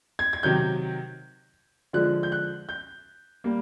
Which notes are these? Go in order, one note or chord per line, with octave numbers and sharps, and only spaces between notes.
G#6
G#6
C3 D#3 F#3 G6
D3 F3 G#3 F#6
G6
F#6
G6
G3 A#3